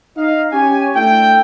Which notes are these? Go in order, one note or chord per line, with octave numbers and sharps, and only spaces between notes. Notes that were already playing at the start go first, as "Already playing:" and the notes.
D#4 D#5 F5
C#4 G4 C#5 G#5
A3 D4 E4 A4 G5